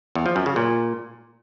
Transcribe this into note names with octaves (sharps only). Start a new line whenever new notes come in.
E2
F3
F#2
C#3
A#2